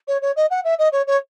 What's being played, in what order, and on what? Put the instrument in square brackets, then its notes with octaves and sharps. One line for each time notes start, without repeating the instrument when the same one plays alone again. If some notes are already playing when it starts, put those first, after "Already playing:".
[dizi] C#5
C#5
D#5
F#5
E5
D#5
C#5
C#5